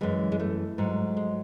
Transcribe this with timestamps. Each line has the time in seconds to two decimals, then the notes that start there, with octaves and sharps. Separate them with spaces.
0.01 F#2 E3 G#3
0.32 G#3
0.40 A3
0.78 G#2 F#3
1.17 G#3